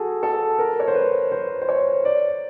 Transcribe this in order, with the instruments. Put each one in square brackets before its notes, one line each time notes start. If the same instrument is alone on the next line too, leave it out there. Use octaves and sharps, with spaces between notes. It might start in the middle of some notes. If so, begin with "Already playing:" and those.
Already playing: [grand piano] F#4 G#4 A4
A4
A#4
C#5
C5
B4
C5
C5
C#5
D5